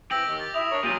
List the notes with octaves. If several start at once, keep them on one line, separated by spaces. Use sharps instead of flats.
E3 C4 G4 E6 A#6 D7 F#7
D#2 D#3
A6
E4 E5 D#6 F7
D4 A#4 C#5
A#2 F#3 F4 G4 D#7